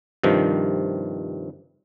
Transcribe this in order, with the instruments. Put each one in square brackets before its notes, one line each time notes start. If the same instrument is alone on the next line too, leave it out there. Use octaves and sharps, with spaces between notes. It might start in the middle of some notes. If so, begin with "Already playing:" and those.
[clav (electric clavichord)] G2 C3 D#3 F3